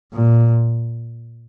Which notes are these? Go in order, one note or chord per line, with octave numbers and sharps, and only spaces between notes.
A#2